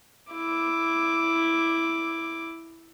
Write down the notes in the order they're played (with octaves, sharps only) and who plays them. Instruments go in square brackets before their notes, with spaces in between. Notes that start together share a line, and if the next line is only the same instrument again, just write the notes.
[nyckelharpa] E4 D6